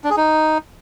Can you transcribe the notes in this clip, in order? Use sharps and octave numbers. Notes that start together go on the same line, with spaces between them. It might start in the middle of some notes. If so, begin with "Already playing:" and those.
D4
G#4
D#4